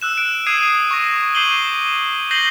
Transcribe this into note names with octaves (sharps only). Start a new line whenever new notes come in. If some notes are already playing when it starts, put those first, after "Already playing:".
E6 F#6 E7
D7
D#6 G#6 C7 D#7
C#6 A#6
D6 G6 C7 D#7 F#7 G7
G6 A#6 C7 D#7 F#7 G7